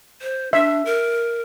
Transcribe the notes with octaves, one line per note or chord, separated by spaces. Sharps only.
C5
D4 E5
A#4